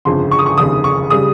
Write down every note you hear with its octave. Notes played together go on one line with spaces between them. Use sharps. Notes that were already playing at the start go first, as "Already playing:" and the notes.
G1 F2 C#3 C6
C#6
D#6
C#6
F1 D#2 C#3 D#6
C#6
C#3 G3 D#6